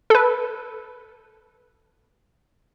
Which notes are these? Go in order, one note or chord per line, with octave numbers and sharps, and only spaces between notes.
A4 B4